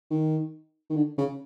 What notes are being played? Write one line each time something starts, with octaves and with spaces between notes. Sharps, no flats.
D#3
D#3
D3
C#3